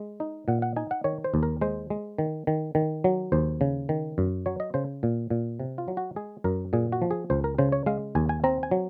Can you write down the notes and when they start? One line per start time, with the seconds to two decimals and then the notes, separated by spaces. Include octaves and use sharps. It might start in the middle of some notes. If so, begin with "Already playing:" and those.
Already playing: G#3
0.20 D#4
0.48 A#2 F#5
0.62 F#5
0.76 D#4 G#5
0.91 F#5
1.04 D#3 C#5
1.24 C5
1.34 D#2
1.43 A#4
1.61 G#3 C5
1.90 G#3
2.18 D#3
2.47 D#3
2.75 D#3
3.04 F#3
3.32 D#2 C5
3.61 C#3
3.89 D#3
4.18 F#2
4.46 F#3 C#5
4.60 D#5
4.74 C#3 C5
5.03 A#2
5.30 A#2
5.60 C3
5.78 F4
5.88 F#3
5.97 F#4
6.16 G#3 G#4
6.44 F#2 A#4
6.73 A#2 G#4
6.92 F#4
7.02 F3
7.11 G#4
7.30 C#2 C5
7.44 A#4
7.58 C#3 C5
7.72 C#5
7.86 G#3 F5
8.15 D#2 G#5
8.29 G#5
8.44 C4 A#5
8.63 G#5
8.71 F#3